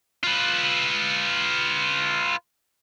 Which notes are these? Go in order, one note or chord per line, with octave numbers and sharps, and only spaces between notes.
F4 B4